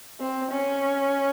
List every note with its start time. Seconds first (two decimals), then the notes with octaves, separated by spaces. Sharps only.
0.20 C4
0.51 C#4